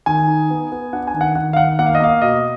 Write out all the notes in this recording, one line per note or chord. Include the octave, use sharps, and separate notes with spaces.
D#3 G#5
D#4
B3
B3
D4 F#5
G#5
D#3
F#5
D#3 F#5
F5
D#3 F#5
A#3 F#5
F5
D#5
A#3 F5
B2 D#5